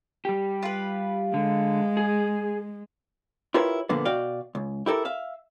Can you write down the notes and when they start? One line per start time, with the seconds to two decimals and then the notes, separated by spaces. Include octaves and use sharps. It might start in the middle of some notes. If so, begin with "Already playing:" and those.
0.25 G3 G4
0.63 F4 B4
1.34 D3 G#3
1.97 G#4
3.54 E4 F4 G4 A#4 B4 C#5
3.89 A#2 D3 F3 A#3 B3
4.05 B2 F#4 D5 F5 G5
4.55 C#2
4.86 E4 G4 A4 A#4
5.05 E5 F5